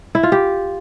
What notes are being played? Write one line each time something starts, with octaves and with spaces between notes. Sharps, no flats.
E4
F4
G4